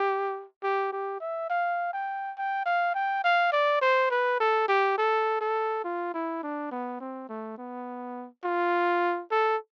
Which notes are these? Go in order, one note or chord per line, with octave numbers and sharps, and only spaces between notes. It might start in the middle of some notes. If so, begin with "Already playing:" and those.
Already playing: G4
G4
G4
E5
F5
G5
G5
F5
G5
F5
D5
C5
B4
A4
G4
A4
A4
F4
E4
D4
B3
C4
A3
B3
F4
A4